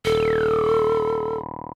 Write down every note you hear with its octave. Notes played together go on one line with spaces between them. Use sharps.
D#1 A4